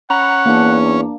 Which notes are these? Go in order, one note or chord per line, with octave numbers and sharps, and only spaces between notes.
C#4 F#5 A#5 B5
E2 A#3 D4